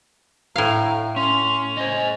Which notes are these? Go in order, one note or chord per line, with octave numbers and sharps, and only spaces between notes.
A2 F5 A#5
C#4 C6 F7
C5 D#5 G#5